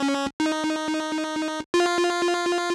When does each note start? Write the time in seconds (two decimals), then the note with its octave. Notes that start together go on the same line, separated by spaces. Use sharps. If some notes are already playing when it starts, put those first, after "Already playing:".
Already playing: C#4
0.40 D#4
1.74 F4